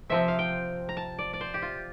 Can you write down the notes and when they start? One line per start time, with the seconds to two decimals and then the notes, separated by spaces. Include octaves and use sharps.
0.09 C3 F3 C4 E5
0.28 F5
0.39 G5
0.89 A#5
0.97 A5
1.19 D5
1.33 D5
1.41 C5
1.54 G4
1.62 F4